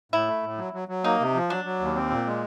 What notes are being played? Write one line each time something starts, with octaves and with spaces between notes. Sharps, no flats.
A2 E4
A3
A2
F#3
F#3
F#3
A#3 D#4
C3
F3
F#3 D4
F#3
D#2
C4
A#2
G#3